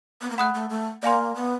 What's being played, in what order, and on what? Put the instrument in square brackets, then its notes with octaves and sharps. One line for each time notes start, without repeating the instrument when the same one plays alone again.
[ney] B3
A#3
[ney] A3 [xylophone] F#5 B5 D#6 F#6
[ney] A3
A3
[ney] A#3 [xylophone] D5 F5 G#5 C6
[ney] B3